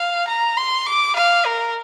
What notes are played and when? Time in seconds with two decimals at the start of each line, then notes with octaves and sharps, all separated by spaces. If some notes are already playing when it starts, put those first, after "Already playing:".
Already playing: F5
0.28 A#5
0.57 C6
0.87 D6
1.16 F5
1.46 A#4